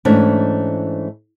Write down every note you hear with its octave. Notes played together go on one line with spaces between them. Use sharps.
G#2 E3 A3 C#4 D4